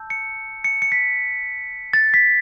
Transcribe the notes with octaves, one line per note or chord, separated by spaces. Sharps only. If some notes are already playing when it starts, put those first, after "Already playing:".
Already playing: A5 E6 G6
C#7
C#7
C#7
B6
A6
B6